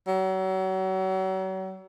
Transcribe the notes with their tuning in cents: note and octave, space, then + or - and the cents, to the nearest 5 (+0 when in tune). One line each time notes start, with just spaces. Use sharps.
F#3 +35